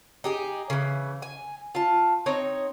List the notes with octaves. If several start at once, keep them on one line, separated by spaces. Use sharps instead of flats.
D#4 G4 G#4
C#3 E3
G#5
F4 A5
C4 D#4 C#5